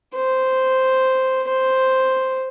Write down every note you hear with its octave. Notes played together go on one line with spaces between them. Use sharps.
C5
C5